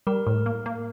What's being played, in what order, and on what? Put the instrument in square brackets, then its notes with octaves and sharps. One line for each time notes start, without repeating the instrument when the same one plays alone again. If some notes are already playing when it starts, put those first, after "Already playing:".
[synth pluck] G3 [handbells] A#4
[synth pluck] A2
A#3
A#3